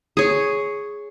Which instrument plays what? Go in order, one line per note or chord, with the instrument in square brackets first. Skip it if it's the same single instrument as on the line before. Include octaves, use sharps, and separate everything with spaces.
[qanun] G#4 C#5